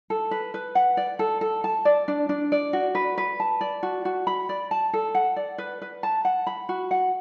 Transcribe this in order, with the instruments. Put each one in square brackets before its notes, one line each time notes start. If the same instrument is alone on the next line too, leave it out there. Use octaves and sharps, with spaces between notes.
[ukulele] A4
B4
B4
F#5
D5
A4
A4
A5
D5
D4
D4
D5
F#4
B4
B4
A5
D5
F#4
F#4
B5
D5
A5
A4
F#5
D5
B4
B4
A5
F#5
B5
F#4
F#5